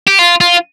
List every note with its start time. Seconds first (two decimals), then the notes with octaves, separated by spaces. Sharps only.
0.07 G4
0.19 F4
0.41 F4